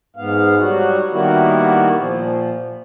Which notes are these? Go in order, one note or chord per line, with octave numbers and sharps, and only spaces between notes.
G#2 B3 F5
F#3 G3 F#4
D#3 G3 A#3 B3 E4 F#4
A#2 F3